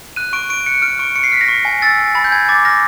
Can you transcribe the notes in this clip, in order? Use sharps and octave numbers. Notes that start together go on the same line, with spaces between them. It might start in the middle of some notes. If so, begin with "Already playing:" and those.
F#6 D#7
C#6 D7
C#6 D7
F#6 C#7
F6 D7
C#6 D7
C#6 C#7
C7
F6 B6
A#6
C#6
G#5
E6 A6
G#5
B5 A6
G6
G#5 G#6
D6 A6
F6 A#6